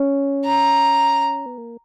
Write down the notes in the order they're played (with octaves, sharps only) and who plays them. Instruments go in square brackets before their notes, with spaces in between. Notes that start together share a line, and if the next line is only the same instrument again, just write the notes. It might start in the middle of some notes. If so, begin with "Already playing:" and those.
Already playing: [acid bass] C#4
[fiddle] A#5
[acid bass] B3
A#3